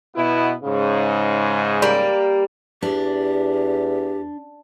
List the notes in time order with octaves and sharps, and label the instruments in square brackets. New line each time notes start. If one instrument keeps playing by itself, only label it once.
[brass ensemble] B2 B3 E4
G#2 C#3
[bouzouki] G3 A#3
[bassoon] E2 [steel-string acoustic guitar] D4 [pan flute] G4